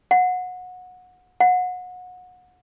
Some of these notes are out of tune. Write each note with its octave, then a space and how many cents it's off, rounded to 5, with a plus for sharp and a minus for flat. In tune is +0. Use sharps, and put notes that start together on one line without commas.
F#5 -20
F#5 -25